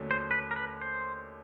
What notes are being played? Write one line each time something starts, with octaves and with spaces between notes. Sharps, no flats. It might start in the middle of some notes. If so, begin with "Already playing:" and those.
Already playing: D#2 D3 F#3 A3 C#4
C5
B4
A#4
B4
C5